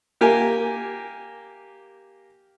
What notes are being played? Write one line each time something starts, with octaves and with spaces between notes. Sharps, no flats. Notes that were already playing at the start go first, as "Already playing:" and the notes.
A#3 G4 A#4 G#5